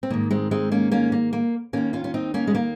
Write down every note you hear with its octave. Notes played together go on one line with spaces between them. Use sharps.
C4
G#2 D#3 A#3
G#3 C4
G#3 C4
A#3 C#4
A#3 C#4
A#3
A#3
D#2 D#3 A#3 C#4
C#4 F4
C#4
C4 D#4
A#3 C#4
G#3
A#3